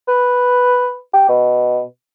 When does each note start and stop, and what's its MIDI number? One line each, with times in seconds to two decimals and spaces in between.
0.08 0.97 71
1.14 1.24 67
1.29 1.81 47